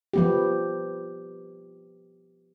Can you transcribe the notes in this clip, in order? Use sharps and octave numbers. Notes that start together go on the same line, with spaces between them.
F3 B3 G4